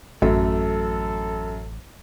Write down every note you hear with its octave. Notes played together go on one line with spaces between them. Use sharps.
A1 F#2 A3 A4